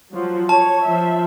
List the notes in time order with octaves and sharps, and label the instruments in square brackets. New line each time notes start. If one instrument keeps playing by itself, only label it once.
[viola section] F3 F#3
[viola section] C#5 [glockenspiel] A5
[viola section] F3 E5